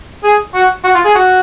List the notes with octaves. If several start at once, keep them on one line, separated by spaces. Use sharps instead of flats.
G#4
F#4
F#4
F4
G#4
F#4